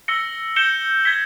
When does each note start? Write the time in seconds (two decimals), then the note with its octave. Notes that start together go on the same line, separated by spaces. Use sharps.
0.08 E6 A#6 C#7 G7
0.56 G6 C#7 E7 G7
1.05 G#6 B6 G7